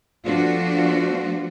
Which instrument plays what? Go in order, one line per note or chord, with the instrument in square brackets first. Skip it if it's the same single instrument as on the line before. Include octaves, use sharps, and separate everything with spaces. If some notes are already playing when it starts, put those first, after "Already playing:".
[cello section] F3 A3 B3 D4 F4 F#4